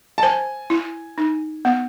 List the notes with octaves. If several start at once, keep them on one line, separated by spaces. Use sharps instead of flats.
A5
C5 G#5
E4
D#4
B3